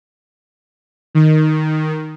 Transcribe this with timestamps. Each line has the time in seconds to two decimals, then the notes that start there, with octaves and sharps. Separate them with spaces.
1.15 D#3